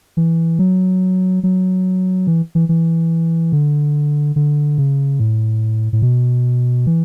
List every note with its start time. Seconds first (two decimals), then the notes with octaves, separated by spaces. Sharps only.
0.17 E3
0.59 F#3
1.43 F#3
2.27 E3
2.55 E3
2.69 E3
3.52 D3
4.36 D3
4.78 C#3
5.20 A2
5.93 A2
6.02 B2
6.87 E3